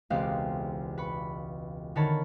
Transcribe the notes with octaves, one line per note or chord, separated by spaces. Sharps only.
E1 C#2 C4 G4 F5 F#6
B4 B5 C#6
D3 D#3 A#4 C#5 A5 B5